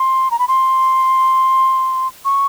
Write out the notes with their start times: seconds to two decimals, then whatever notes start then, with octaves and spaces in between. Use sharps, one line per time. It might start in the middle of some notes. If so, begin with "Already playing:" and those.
Already playing: C6
0.31 A#5
0.39 B5
0.48 C6
2.25 C#6